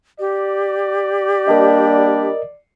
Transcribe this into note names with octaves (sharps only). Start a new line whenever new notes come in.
G4 D5
G3 A#3 D4 A#4 D#5